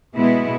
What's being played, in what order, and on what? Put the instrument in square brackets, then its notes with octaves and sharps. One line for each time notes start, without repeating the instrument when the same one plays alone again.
[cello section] B2 G#3 B3 E4